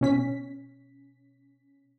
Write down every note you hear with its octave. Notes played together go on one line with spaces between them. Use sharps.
B2 C#4 B6